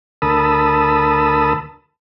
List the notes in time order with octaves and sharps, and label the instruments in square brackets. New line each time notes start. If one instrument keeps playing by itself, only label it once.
[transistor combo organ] D2 A#4 A5 B5 D#6 E6